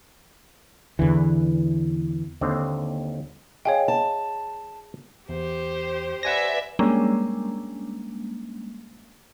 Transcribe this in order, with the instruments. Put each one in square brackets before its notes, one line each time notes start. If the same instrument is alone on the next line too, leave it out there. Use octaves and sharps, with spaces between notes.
[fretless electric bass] E2 D3 E3
[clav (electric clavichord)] D#2 D3 C4
[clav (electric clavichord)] G#4 D#5 [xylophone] C#5 F5 G5
[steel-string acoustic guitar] A5
[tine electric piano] E2 [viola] G4 C5
[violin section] B4 D5 E5 [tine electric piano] F#5 G#5 A#6
[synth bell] G3 G#3 A#3 C#4 D4